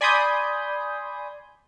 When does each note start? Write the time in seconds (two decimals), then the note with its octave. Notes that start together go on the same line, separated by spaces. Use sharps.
0.01 D5 G#5 B5 C6 D#6 G6